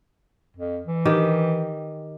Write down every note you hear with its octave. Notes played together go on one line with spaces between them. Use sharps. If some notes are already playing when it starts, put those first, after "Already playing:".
F2
E3
D#3 G4